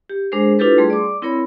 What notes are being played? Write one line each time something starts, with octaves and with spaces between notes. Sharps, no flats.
G4
G#3 D4 G#4 A#4 C5
D4 E4 F4 G4 A4 B4
G3 A3 G#4 C6
D5 D6
C4 E4 A#4 C#5 B5